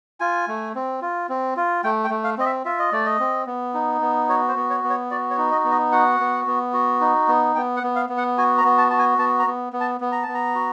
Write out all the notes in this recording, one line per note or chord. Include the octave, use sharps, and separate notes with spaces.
F4 G#5
A3
C4
F4
C4
F4
A3 G5
G5
A3
F5
C4 D#5
E5
F4 E5
D#5
A3 D5
D#5
C4
B3
D#4
B3
F#4 C#5
C5
B3
C#5
B3
C#5
F#4 D5
C#5
D#4
D#5
B3
D#5
F#4 F#5
B3
B3
F#4
D#4
B3
B3 G5
F#5
B3
F5
B3
F#5
F#4 G#5
A#5
B3
A5
F#4 A5
G#5
B3 A5
A#5
B3
B3
A5
B3
A#5
A5
B3
A#5
F#4